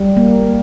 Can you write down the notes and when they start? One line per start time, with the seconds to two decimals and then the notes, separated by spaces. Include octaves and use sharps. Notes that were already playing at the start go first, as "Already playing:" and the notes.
Already playing: G3
0.17 A#3